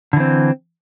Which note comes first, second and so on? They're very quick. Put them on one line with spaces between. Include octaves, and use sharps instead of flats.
D3 E3 C4